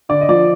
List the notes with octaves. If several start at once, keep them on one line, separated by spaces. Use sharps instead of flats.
D3 D5
D#5
F3 D5